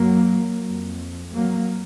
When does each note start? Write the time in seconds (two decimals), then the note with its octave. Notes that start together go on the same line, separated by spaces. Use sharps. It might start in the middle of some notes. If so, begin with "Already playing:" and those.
Already playing: F#2 F#3 A#3
0.65 F2
1.34 F#3 A#3